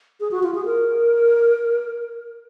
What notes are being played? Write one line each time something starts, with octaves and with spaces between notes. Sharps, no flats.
G#4
F#4
F4
G#4
A#4